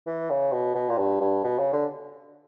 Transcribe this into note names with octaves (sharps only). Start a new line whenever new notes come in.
E3
C#3
B2
B2
A#2
G2
G2
B2
C#3
D3